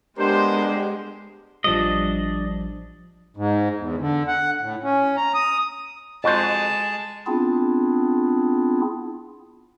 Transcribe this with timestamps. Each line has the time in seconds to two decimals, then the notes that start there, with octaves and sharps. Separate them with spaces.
0.18 G#3 B3 D4 G4 A#4 C5
1.64 A1 F3 G3 D4 D#5
3.37 G#2
3.79 E2
3.99 D3
4.27 F#5
4.61 A2
4.84 C#4
5.17 A#5
5.34 D#6
6.24 F2 G#3 F#4 C5 A5
7.27 B3 C4 D4 E4 F4 G#4